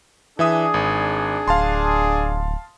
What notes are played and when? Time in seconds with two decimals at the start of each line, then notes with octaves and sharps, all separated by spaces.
0.39 E3 D4 G#4 E5 D#6
0.74 G#1
1.48 D1 F5 A5 C6